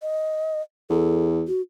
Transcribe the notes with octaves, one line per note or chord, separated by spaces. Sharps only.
D#5
E2 A4
F#4